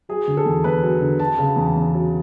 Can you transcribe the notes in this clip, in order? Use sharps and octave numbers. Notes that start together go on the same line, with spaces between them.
F#3 G#4
D3
A4
E2
E2 B4
F#3
D3
F#3 A5
C#3
E2
E2
F#3